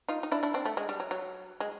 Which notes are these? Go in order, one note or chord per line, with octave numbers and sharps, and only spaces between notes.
D#4 F4
D#4
D4 E4
D4 E4
C4 D4
A3
G#3
G3
F#3
F#3
G#3